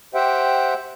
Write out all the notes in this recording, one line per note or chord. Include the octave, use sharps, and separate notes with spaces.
G4 C5 E5 F#5 G5